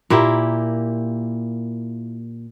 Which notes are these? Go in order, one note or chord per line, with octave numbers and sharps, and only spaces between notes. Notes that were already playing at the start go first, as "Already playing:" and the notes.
A#2 A#3 E4 G4